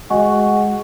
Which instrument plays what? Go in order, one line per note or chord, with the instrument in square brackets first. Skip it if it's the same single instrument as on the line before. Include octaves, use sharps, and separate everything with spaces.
[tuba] G#3 [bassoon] F#4 [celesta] D#5 G#5 C#6